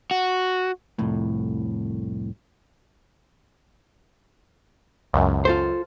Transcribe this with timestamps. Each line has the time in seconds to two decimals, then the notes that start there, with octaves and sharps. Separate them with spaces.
0.11 F#4
0.98 C2 F2 A2
5.13 C#2 F#2
5.45 F4 A4 C5